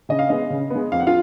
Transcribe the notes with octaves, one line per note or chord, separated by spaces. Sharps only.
C#3 D#5
F5
G#3 B3 D#5
C#3
G#3 B3
F2 F5
F#5
F4 F5